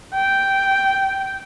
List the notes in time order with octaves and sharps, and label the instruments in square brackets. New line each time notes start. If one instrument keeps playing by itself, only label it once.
[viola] G5